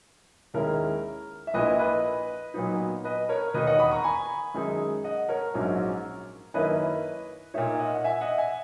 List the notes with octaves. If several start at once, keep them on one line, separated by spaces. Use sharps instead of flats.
D#2 D#3 G#3 C#4 E4 A#4
E5
A#1 A#2 A#3 E4 B4 D#5
B4 D#5
A#2 F#3 B3 D#4
B4 D#5
A#4 C#5
E1 D#2 D#3 A#3 D#4 B4 D#5
D#5 F#5
B5 D#6
A#5 C#6
G#5 B5
F#2 D#3 G#3 D#4
D#5 F#5
A#4 C#5
A#1 G#2 F#3 C#4
F#2 D#3 A#3 C#4 E4 B4 D#5
A#2 A#3 D#4 C#5 E5
D#5 F#5
F#5
E5 G#5
D#5 F#5
E5 G#5